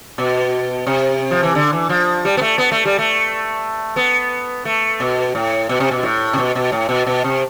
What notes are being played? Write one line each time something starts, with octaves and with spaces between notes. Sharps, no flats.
B2
C3
F3
E3
D3
E3
F3
G3
B3
A3
B3
A3
G3
A3
B3
A3
B2
A2
B2
C3
B2
A2
C3
B2
B2
A2
B2
B2
C3